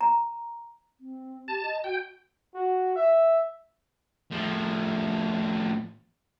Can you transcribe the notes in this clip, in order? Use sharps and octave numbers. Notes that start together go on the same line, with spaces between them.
A#5
C4
G4 A5
D#5
F#4 G5
F#4
E5
A2 F3